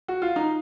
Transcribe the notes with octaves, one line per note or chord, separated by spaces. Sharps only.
F#4
F4
D#4